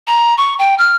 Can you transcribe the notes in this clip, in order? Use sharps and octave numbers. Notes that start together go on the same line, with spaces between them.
A#5
C#6
G5
F6